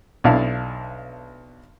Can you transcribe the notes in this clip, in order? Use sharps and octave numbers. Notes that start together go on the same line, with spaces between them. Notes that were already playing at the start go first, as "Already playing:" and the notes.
B1 D4 E4 F5